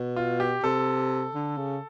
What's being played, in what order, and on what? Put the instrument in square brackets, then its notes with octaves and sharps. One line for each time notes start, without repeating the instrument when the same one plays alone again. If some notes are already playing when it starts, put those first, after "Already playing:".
Already playing: [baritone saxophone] B2
[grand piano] F4
G4
[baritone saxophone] C3 [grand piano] A4
[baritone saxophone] D3
C#3